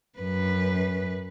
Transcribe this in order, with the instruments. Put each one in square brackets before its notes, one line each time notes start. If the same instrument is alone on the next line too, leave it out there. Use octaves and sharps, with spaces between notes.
[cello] F#2 B4